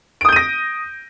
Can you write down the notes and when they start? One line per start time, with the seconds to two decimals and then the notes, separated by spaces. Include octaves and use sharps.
0.21 D7
0.25 D#6
0.29 G6
0.32 D#7
0.36 A#6